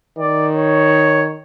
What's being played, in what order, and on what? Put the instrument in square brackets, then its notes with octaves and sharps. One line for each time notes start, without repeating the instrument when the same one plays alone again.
[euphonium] D#3 [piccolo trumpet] D5
[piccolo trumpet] C#5